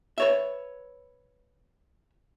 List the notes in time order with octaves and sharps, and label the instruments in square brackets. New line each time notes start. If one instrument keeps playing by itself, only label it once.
[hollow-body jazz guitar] B4 C#5 E5